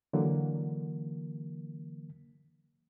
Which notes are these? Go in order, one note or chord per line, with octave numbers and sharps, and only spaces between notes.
D3 E3 F#3 A#3